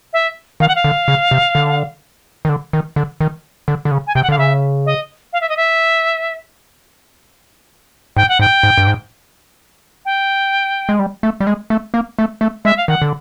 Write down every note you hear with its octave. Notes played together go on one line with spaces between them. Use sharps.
E5
D#3 F5
F#5
F5
D3
C#3
C3
D3
D#3
D3
D#3
D3
D#3
D3
D3
C#3
G#5
C3 G5
F#5
D3 F5
C#3 E5
D#5
F5
E5
D#5
E5
G#2 G5
F#5
G#2 G5
G#2
G2
G#2
G5
G#3
G3
A3
G3
G#3
A3
A#3
A3
A3
G#3 E5
F5
D#3 F#5
D3